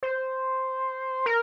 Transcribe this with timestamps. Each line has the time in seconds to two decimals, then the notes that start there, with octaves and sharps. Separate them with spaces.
0.03 C5
1.26 A#4